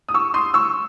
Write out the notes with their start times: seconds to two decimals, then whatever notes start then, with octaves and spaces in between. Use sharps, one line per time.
0.08 D#6
0.14 C#6 E6
0.34 C6 D#6
0.54 C#6 E6